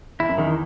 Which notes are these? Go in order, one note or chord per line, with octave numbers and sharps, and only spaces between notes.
E2 E4
F#2
E2 D#3